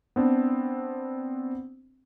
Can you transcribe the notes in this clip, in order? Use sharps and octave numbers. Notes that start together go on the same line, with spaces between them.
B3 C4 D4